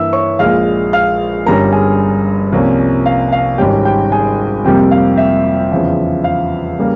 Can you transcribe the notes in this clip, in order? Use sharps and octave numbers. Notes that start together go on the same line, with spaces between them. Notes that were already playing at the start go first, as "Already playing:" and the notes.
Already playing: G2 E3 A#3 E5 E6
C#5 C#6
A#1 A#2 G#3 F5 F6
F5 F6
G1 G2 G3 C#4 A#4 A#5
G#4 G#5
C2 C3 F3 A#3 C#4
F5
F5
G#1 G#2 G3 C#4 G4 G5
G4 G5
G#4 G#5
F2 C3 G3 A#3 G4 G5
F5
E5
E2 C#3 F3
F5
C#3 G3 A#3